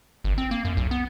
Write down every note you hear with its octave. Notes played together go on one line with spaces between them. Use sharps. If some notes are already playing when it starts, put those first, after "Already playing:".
G1
C4
A#3
F#2
B1
B3